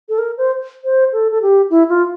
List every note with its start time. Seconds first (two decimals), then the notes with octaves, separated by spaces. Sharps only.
0.09 A4
0.18 A#4
0.38 C5
0.84 C5
1.13 A4
1.32 A4
1.42 G4
1.70 E4
1.89 F4